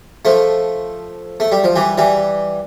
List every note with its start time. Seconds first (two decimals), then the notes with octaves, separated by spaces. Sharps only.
0.25 F3 A3
1.40 A3
1.52 G3
1.64 F3
1.76 E3 G3
1.98 E3 G3